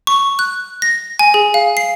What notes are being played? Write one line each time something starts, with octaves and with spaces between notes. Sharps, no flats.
C#6
F#6
A#6
G#5
G#4
F5
C7